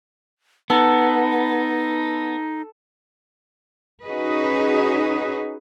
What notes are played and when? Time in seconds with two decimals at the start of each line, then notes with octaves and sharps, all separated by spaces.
0.70 B3 D#4 A4
4.05 C#4 D#4 F#4 G#4 B4 D#5